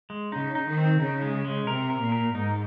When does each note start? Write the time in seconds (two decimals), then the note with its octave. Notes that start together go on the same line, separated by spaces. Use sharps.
0.10 G#3
0.32 C#3 D#4
0.55 D#4
0.67 D#3
0.77 C4
1.00 C#3 D#4
1.22 G#3
1.45 G#3
1.67 C3 A#4
1.90 A#4
2.01 A#2
2.12 A#4
2.35 G#2 D#4